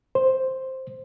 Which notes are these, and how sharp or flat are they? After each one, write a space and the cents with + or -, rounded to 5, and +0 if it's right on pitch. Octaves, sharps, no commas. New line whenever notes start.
C5 +5